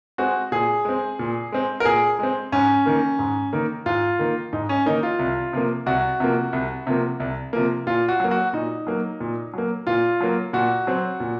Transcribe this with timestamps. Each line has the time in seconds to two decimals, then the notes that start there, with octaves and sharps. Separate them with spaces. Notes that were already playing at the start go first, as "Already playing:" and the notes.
0.18 G#3 C4 F#4
0.52 A#2 G#4
0.85 G#3 C4
1.19 A#2
1.52 G#3 C4
1.80 A#4
1.85 A#2 G#4
2.19 G#3 C4
2.52 G#2 C#4
2.86 D#3 A#3
3.19 G#2
3.53 D#3 A#3
3.86 G#2 F4
4.19 D#3 A#3
4.53 G#2 D#4
4.69 C#4
4.86 D#3 A#3 D#4
5.03 F4
5.19 C2
5.53 C3 F3 A#3
5.86 C2 F#4
6.20 C3 F3 A#3
6.53 C2
6.87 C3 F3 A#3
7.20 C2
7.53 C3 F3 A#3
7.87 A#2 F4
8.08 F#4
8.20 F#3 A#3
8.31 F#4
8.53 A#2 D#4
8.87 F#3 A#3
9.20 A#2
9.54 F#3 A#3
9.87 A#2 F4
10.21 F#3 A#3
10.53 A#2 F#4
10.87 F#3 C4
11.20 A#2